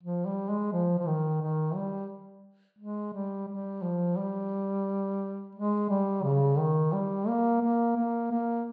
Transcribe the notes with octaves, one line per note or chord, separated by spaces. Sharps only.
F3
G3
G#3
F3
F3
D#3
D#3
G3
G#3
G3
G3
F3
G3
G#3
G3
C#3
D#3
G3
A#3
A#3
A#3
A#3